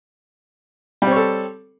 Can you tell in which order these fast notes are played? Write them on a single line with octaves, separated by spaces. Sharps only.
G3 C4 C#5 A4